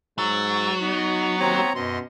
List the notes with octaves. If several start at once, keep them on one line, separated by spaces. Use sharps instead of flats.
G#2 F#3 C#6 E6 A6
B3 D#4
D#2 C4 C#5 A#5
F#2 B2 D#5 C6